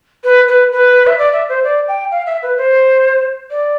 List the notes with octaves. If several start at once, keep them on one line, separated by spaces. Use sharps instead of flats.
B4
B4
B4
E5
D5
E5
C5
D5
G5
F5
E5
B4
C5
D5